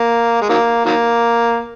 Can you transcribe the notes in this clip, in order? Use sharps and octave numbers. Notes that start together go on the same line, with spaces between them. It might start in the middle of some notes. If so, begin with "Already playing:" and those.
Already playing: A#3
G#3
D#3 F#3 A#3
D#3 F#3 A#3